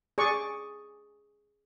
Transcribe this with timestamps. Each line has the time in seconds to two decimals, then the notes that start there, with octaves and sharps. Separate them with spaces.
0.18 G#4 D5 C#6